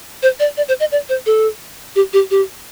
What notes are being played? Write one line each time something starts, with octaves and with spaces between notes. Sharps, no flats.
C5
D5
D5
C5
D#5
D5
C5
A4
G4
G4
G4